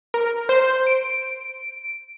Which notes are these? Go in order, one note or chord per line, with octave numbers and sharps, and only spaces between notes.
A#4
C5
D7